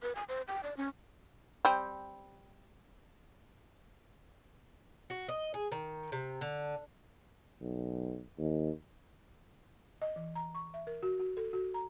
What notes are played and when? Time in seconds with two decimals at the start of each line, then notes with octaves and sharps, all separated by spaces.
0.02 B4
0.15 G#5
0.29 C5
0.48 G5
0.64 D5
0.77 C#4
1.65 G3 C4
5.10 F#4
5.29 D#5
5.54 G#4
5.72 D#3
6.12 C3
6.41 D3
7.61 B1
8.38 D#2
10.02 D#5
10.16 E3
10.35 A#5
10.55 C#6
10.74 E5
10.87 A#4
11.03 F#4
11.20 F#4
11.37 A4
11.53 F#4
11.74 A#5